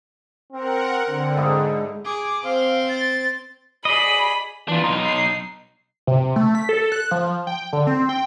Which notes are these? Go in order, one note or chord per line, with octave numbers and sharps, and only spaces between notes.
C4 A#4 F#5
D3 C4
G#2 D#4 E4
G#4 D6
C4 C5 F5
A6
G#4 D5 D#5 B5
E3 D4 F4
B1 D#4 C6
C7
C3
A3
B6
A4
F#6
F3
G5
D3
C4
G5